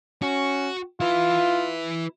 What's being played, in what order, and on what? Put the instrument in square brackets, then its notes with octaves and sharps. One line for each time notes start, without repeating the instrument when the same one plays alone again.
[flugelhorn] C#4 [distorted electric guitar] F#4
[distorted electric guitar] E4 B4 [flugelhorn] F4